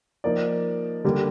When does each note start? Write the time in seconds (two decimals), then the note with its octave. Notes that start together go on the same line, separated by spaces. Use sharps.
0.24 F3 A#3 D#4 D5
1.04 D3 G3 A#3